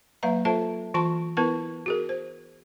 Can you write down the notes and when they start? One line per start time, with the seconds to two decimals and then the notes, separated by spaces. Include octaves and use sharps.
0.23 F#3 A#3 B4 E5 F5 A#5
0.45 F4 A4 C5 E5 A5
0.94 E3 F4 A5 C6 C#6
1.37 B3 E4 A#4 B4 A5 C#6
1.86 F#4 G#4 A#4
2.09 C5